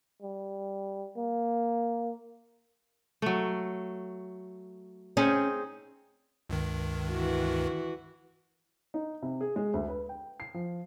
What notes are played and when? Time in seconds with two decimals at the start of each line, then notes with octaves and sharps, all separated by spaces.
0.22 G3
1.17 A#3
3.22 F#3 A3
5.17 C4 C#4 D#4 G#4
6.50 C#2 G2 D#3
7.09 E3 F#4
8.94 D#4
9.22 C3
9.41 G#4
9.56 G#3
9.74 D2
9.88 B4
10.09 G5
10.40 C7
10.54 F3